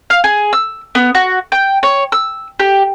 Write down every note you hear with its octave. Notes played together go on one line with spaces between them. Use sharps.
F5
G#4
E6
B3
F#4
G5
C#5
E6
G4